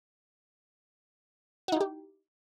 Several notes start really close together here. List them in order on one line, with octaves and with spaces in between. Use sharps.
F#4 D#4 E4 G4